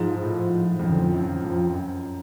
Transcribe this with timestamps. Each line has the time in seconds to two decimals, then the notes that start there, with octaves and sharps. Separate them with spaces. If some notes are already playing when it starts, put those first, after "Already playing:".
Already playing: G#2 F3
0.14 G#2
0.23 A2
0.79 F2
0.84 F#2 F3
0.92 D3
1.01 F3
1.14 F#2
1.44 F2
1.74 F#2